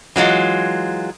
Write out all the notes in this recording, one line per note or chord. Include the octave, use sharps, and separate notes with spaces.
E3 F#3 G#3 F4